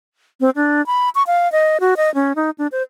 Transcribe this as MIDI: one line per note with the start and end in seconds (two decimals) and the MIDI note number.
0.41 0.50 60
0.56 0.85 62
0.86 1.09 83
1.15 1.23 85
1.27 1.51 77
1.52 1.78 75
1.80 1.94 66
1.97 2.13 75
2.15 2.33 61
2.36 2.50 63
2.58 2.67 62
2.72 2.82 72